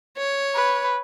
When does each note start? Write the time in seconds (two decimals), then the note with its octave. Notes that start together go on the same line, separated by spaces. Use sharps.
0.17 C#5
0.54 B4